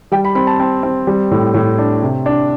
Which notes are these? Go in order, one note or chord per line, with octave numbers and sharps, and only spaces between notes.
G3 G5
B5
C4 B5
A5
C4
C4
G3
A2
A2
D4
C3
D4